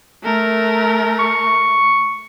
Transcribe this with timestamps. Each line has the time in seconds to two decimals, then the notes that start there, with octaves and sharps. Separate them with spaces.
0.23 A3 A#4
1.19 C#6